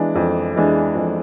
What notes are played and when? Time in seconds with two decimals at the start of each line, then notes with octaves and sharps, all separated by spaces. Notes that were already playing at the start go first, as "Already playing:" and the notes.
Already playing: E3 G#3 D4
0.15 F2
0.56 E3 G#3 D4
0.95 F2